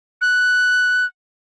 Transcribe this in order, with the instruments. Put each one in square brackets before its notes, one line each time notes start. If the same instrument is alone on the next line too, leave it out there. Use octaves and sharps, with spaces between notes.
[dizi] F#6